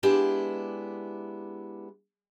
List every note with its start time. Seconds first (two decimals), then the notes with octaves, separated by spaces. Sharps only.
0.03 G#3 B3 D4 E4 G4